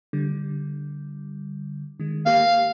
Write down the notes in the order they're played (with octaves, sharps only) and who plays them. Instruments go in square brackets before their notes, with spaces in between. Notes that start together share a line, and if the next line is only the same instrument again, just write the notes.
[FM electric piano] D3 G3
D#3 G#3
[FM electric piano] A#3 G4 [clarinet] F5